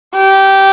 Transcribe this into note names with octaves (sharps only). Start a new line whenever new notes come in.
G4